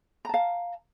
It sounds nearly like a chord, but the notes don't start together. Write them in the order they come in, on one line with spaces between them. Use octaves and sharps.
A#5 A5 F5